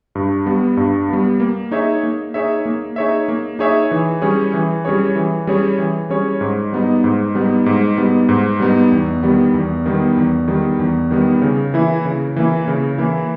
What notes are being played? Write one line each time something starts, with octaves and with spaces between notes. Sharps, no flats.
G2
G3 B3
G2
G3 B3
A#3
D#4 G#4 C#5 E5
A#3
D#4 G#4 C#5 E5
A#3
D#4 G#4 C#5 E5
A#3
D#4 G#4 C#5 E5
E3
G3 C#4 G#4 C#5
E3
G3 C#4 G#4 C#5
E3
G3 C#4 G#4 C#5
E3
G3 C#4 G#4 C#5
G#2
G3 B3 D#4
G#2
G3 B3 D#4
G#2
G3 B3 D#4
G#2
G3 B3 D#4
E2
D#3 G3 B3
E2
D#3 G3 B3
E2
D#3 G3 B3
E2
D#3 G3 B3
C#3
E3 A#3 E4
C#3
E3 A#3 E4
C#3
E3 A#3 E4